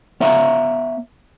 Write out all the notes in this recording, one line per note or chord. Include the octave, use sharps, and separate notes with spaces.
B3 C#5 E5 F5 A#5